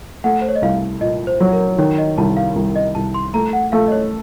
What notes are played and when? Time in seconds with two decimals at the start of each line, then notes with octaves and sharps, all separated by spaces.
0.24 A3 F#5
0.41 C5
0.48 C#5
0.56 D#5
0.62 C2 F5
1.01 A#2 D#5
1.27 C5
1.40 F#3
1.53 A#4
1.78 D#3 C#5
1.98 D#5
2.18 C2 A5
2.37 F5
2.56 C2
2.76 D#5
2.95 C2 A5
3.14 C6
3.34 A3 A#5
3.53 F#5
3.72 A3 F5
3.87 D#5
3.92 C#5